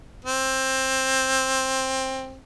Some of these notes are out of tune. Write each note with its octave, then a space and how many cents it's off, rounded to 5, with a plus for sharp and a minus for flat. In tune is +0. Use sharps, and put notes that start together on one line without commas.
C4 +15